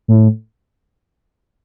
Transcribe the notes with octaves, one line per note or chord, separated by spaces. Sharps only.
A2